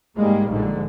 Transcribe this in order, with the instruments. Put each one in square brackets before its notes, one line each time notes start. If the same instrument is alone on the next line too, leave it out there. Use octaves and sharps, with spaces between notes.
[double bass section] G#2 G3 G#3 A#3
A#1 G#2 D3